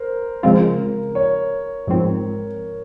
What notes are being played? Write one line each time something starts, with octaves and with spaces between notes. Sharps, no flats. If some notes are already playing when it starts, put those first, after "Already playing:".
Already playing: A#4 C5
C#3 F3 G#3 C4 F4
C#5
G#2 F3 C4